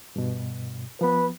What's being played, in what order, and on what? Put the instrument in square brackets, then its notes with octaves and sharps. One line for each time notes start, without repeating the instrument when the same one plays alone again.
[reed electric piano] G2 B2
[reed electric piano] F3 B3 [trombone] B4